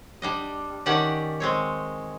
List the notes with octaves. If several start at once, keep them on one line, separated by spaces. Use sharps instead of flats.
G3 D4 D#5
D#3 C#4 G4 D5 F#5 A5
G#3 C4 C#5